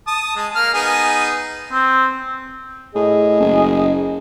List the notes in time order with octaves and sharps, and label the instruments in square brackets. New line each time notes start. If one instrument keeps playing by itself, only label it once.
[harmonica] A5 D#6
G#3 A5
A#3 F6
B3 D#4 G#4
[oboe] C4
[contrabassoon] A2 [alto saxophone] G#4 [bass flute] D#5
[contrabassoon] F#1